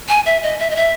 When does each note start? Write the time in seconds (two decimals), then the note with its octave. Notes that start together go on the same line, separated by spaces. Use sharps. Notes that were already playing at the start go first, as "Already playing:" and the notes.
0.08 G#5
0.26 E5
0.43 D#5
0.59 E5
0.70 D#5
0.76 E5